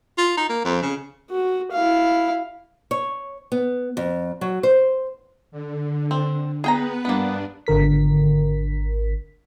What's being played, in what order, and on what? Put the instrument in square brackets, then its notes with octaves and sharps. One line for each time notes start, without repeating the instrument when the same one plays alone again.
[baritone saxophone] F4
D#4
A#3
F2
C#3
[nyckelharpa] F#4
E4 F5
[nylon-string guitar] C#5
B3
F2
F#3
C5
[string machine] D3
[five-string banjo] C4
[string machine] B3 B4 [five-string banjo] G#4 G5 A#5
[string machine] G2 D4 [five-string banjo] A#3 B3
[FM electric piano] G#1 D3 A#4 B6